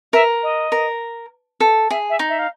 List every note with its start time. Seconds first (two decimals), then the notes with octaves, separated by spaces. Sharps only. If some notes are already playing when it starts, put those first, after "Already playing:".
0.13 A#4 E5
0.43 D#5
0.72 A#4
1.60 A4
1.91 G#4 E5
2.10 E5
2.19 D#4
2.29 E5
2.39 F5